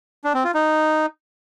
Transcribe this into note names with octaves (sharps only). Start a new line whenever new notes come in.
D4
C4
F4
D#4